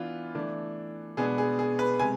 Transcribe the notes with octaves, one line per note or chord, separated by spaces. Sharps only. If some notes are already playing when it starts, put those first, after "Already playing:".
Already playing: E3 B3 D4 F4
E3 A3 D4
B2 G#3 B3 D4 G#4
G#4
G#4
B4
C3 G#3 G#5